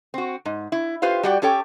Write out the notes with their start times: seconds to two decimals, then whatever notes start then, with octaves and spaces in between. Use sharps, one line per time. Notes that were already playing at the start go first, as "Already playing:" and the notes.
0.14 C4 F#4
0.45 G#2
0.72 E4
1.02 F4 G4 B4 C5 F5
1.23 G3 F#4 G4 D5 F#5 G5
1.42 C#4 G4 A4 C#5 G5